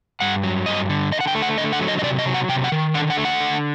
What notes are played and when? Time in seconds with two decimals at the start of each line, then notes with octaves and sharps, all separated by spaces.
0.20 G2 F#5
0.44 F#3
0.66 G2 D#5
0.89 D3
1.12 D3 D#5
1.20 F#5
1.28 G5
1.35 A3
1.42 F#5
1.58 D3 D#5
1.73 F#5
1.81 F#3
1.88 D#5
1.99 D#5
2.03 C3 D5
2.19 D#5
2.26 F#3
2.34 F#5
2.49 C3 G5
2.64 F#5
2.72 D#3
2.94 D3 F#5
3.10 F#5
3.17 A3
3.25 F#5
3.41 D3